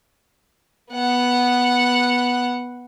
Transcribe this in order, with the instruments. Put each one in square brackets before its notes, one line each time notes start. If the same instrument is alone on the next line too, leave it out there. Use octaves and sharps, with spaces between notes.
[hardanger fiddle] B3 F#5